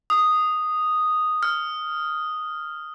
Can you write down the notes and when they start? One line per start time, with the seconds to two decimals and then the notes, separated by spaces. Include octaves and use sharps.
0.10 D#6
1.43 F6